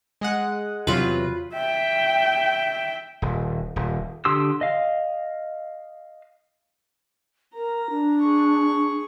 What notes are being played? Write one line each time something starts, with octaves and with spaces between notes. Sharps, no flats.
G#3 D#5 F#5
E2 C3 F#3 F4 B4
E5 G5
D#1
D#1
D3 G4 C6 D#6 E6
D#5 F5
A#4 A#5
D4
G#4 C#6